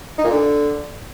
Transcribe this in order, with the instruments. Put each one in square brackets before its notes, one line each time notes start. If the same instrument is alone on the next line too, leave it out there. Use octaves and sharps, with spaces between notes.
[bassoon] D#4
A#2
D3